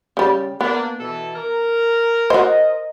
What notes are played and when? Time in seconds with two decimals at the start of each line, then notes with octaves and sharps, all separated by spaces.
0.17 C#3 G3
0.61 A#3 B3 D4
0.99 B2 E3 A4
1.36 A#4
2.30 F#4 C5 D#5